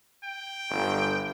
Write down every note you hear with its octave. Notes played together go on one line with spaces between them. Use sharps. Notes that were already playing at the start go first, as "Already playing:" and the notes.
G5
G1